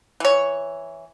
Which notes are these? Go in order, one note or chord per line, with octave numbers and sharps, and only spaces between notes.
E3 C#5